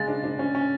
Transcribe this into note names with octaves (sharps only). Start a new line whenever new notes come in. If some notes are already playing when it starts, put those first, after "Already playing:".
Already playing: C#3 G#3 A6
D4
D4
C#4
C#4